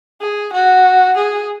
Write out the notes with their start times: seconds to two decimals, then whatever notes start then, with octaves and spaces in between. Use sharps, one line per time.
0.21 G#4
0.53 F#4
1.17 G#4